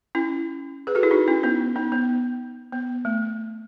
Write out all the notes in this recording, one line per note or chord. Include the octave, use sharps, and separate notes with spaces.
C#4 E4
G#4 B4
F#4 A4
E4 G#4
D#4 F#4
C#4 E4
B3 D#4
B3 D#4
B3
B3
A3